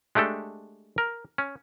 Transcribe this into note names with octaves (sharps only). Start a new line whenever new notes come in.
G#3 A3 D4 G4 A4
A#4
C#4